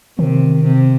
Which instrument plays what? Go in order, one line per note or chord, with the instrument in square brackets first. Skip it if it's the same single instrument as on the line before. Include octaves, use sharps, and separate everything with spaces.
[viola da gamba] C3 [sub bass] D#3
[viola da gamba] C3